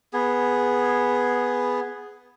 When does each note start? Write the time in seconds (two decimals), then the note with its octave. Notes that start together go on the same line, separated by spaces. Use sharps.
0.13 B3 G#4